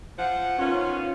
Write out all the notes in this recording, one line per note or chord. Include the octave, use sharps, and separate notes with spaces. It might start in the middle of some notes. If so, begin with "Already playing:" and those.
F3 F#5
D#3 B3 C#4 F4